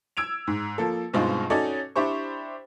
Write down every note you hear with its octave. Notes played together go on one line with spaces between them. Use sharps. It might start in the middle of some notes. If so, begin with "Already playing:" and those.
E6 G#6 D7 F7
G#2
F3 A#3 A4
G2 B2 G#3 C4 D#4 F4
C#4 D#4 F#4 A4 C#5 D5
D4 E4 G4 C5 C#6